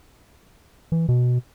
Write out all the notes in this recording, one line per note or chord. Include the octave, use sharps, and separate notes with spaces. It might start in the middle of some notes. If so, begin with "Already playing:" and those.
E3
B2